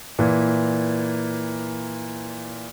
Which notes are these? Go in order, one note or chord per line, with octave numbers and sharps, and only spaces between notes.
A#2 E3